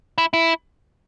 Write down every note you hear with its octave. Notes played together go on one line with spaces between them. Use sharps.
E4
E4